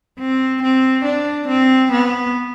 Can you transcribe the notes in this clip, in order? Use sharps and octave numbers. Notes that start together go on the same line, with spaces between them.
C4
C4
D4
C4
B3